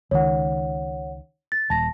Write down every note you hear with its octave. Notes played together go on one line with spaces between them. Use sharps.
C#2 D#3 C#5 F#5
A6
D#1 A5 A#6